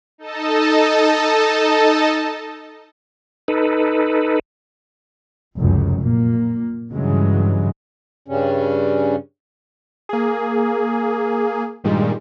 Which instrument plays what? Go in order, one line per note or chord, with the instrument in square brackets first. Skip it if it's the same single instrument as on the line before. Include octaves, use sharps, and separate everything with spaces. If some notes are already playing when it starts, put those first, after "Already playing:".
[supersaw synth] D#4 A4 D#5 A5
[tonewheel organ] D#4 A4 B4
[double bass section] F1 C#2 F#2
A#2 A#3
G2 C#3 E3 F#3 G#3
[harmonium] G2 C#3 G3 C#4
[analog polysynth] A#3 G#4
G2 A#2 D#3 G3 G#3